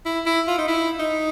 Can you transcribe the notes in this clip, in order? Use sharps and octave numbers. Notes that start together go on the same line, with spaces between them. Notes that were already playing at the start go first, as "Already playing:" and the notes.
E4
E4
F4
D#4
E4
D#4